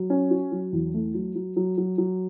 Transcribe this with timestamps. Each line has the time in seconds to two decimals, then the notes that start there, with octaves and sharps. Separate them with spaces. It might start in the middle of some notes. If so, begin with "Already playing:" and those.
Already playing: F#3
0.10 C#4
0.31 F#4
0.52 F#3
0.73 E2
0.94 A3
1.15 F#3
1.35 F#3
1.57 F#3
1.78 F#3
1.98 F#3